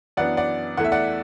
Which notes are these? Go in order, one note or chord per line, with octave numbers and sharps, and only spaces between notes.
F#2 E3 B3 D4 D5 F#5
D5 F#5
E2 E3 A3 F#5
E5
D5 F#5